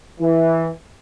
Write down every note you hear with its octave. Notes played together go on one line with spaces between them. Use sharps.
E3